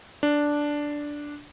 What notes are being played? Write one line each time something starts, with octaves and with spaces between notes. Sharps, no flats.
D4